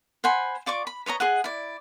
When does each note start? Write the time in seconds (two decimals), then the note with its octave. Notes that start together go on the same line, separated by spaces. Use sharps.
0.24 C5 F#5 G#5 B5
0.66 F4 D5 C#6 D6
0.87 B5
1.06 B4 C#5 D#5 A#5
1.20 G#4 D#5 F#5
1.44 E4 D5